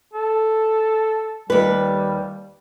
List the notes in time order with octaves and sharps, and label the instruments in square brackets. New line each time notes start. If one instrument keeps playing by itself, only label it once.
[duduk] A4
[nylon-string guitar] D#2 B4 [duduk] G3